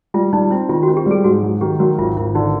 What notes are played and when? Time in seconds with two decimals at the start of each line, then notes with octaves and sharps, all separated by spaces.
0.14 G3 F4
0.33 G3 D#4
0.51 C4 E4
0.69 D#3 F4
0.83 F#4
0.88 C4
0.97 G4
1.06 G3 G#4
1.24 G#2 F#4
1.43 F#3
1.61 D#3 G4
1.79 F#3 F#4
1.98 G#1 F4
2.17 G#1 E4
2.35 D3 D#4